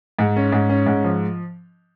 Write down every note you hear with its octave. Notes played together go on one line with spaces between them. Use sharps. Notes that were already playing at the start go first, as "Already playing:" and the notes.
G#2
C#4
G#2
C#4
G#2
F3